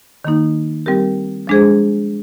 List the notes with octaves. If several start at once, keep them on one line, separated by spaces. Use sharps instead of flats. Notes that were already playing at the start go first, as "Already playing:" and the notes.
D#3 A#3 D#4
G3 C4 G4 A#4
F3 G#3 D4 G#4 C5